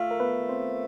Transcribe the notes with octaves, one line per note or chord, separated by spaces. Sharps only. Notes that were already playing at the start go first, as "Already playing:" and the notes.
Already playing: A3 F4 F5
A#4
B3 B4
C4 C5